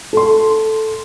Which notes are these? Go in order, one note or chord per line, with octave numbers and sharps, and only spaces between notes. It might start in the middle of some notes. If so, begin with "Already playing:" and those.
A4 C6